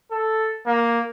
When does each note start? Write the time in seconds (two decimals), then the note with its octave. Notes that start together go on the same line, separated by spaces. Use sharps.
0.12 A4
0.66 A#3